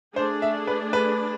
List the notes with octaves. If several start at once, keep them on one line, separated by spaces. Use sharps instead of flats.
A3 D4 G#4 C5
E5
B4
B4